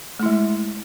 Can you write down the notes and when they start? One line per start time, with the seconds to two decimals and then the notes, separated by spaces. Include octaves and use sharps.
0.19 A3
0.23 E4
0.26 G#3